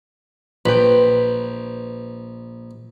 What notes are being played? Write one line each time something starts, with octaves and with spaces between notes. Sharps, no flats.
A#1 B4 G5